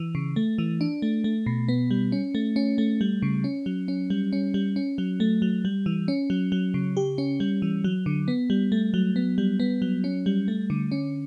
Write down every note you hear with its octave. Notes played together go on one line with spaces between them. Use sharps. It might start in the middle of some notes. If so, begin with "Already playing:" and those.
Already playing: E3
C#3
A3
E3
D4
A3
A3
B2
B3
G3
C#4
A3
C#4
A3
G3
C#3
C#4
F#3
C#4
G3
C#4
G3
C#4
F#3
A3
F#3
G3
E3
C#4
F#3
F#3
C#3
G4
C#4
G3
E3
F#3
D3
B3
G3
A3
F#3
B3
G3
B3
F#3
C#4
G3
A3
D3
C#4